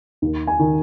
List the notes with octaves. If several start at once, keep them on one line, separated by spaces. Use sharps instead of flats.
D#2
G#5
D#3